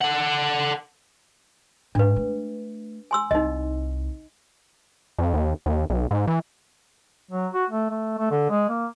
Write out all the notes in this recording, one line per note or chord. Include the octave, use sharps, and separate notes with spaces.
A4 F#5
G#2 D4 B4
A3
G#5 C6 E6
C2 D#4 D#5
F2
D#2
D#2
B1
G#2
E3
F#3
F#4
A3
A3
A3
D3
G#3
A#3